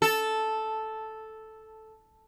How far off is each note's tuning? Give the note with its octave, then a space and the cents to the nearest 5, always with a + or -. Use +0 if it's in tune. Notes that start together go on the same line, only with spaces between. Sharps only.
A4 -5